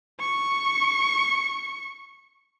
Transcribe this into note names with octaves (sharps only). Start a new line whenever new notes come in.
C#6 C#7